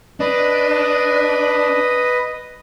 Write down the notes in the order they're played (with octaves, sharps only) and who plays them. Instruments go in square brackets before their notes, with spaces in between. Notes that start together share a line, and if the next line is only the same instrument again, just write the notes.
[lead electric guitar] D4 [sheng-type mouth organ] B4 D#5